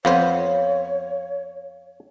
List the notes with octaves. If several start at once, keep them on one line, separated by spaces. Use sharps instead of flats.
F2 B3 C5 C#5 F5